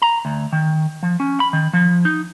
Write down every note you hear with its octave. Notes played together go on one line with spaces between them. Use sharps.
A#5
D2
D#3
F3
C#4
B5
D#3
F3
D#4